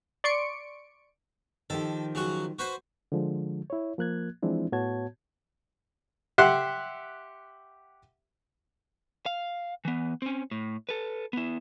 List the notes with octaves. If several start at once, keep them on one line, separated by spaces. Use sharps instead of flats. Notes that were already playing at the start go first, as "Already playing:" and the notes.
D5 C6 C#6 C#7 D7
D#3 F3 G4 A4
C#3 F#3 F#4
F#4 B4 C5
D3 F3 G#3
E4 C#5
F3 A#3 F#6 G#6
E3 F3 G#3 C4 D4 E4
A2 B3 F#4 C#5 A5 G#6
G4 E5 F#5 C6 F#6
F5
E3 B3
C4 C#4
A2
A4 B4
B3 E4